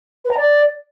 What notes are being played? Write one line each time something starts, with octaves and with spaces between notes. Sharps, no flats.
B4
A#5
D5